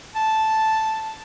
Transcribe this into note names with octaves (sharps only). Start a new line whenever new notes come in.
A5